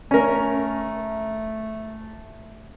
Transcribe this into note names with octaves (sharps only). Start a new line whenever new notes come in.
A3 C#4 A#4